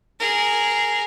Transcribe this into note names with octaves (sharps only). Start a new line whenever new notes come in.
G#4 A#4